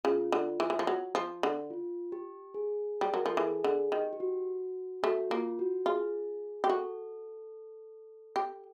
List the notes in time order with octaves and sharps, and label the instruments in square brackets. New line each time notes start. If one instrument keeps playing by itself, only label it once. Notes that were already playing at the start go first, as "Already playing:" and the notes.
[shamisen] C#3 [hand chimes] F4
[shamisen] D3
E3
E3
F3
F#3
F3
D3
[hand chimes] F4
G4
G#4
[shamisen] G3
[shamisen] F#3 [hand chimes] A#4
[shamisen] F3 [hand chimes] A4
[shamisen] E3 [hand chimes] G#4
[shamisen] D3 [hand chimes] G#4
[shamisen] D#3 [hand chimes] G4
[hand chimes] G4
F#4
[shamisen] A3 [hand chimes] F#4
[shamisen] A#3 [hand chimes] F4
[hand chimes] F#4
[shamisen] F4 [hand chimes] G#4
[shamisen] G4
[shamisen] F#4 [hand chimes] A4
[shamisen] G4